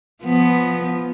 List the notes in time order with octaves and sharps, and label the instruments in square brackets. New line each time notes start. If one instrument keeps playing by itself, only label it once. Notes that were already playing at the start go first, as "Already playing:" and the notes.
[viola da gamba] F3 B3